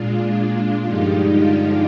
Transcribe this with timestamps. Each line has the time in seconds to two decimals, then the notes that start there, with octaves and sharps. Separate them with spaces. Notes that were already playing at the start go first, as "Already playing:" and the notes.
Already playing: A#2 G#3 D4 F4
0.82 G2 D3 F3 G#3 D#4 G4
1.31 D4 F4